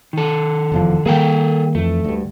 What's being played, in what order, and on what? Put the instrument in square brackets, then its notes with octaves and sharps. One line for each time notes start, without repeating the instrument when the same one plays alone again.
[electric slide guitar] D#3 A4
[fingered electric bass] F1 E2 F3
[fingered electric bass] D#3 G3 A#3 [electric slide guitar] G#4 A4 G5
[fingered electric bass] F2 E3 [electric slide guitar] A3
[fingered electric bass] D2 G2